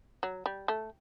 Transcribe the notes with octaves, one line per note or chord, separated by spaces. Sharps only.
F#3
G3
A3